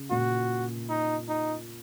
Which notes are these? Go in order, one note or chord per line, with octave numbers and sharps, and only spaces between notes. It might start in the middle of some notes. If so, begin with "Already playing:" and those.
Already playing: C#3
A#2 F#4
D#4
D#4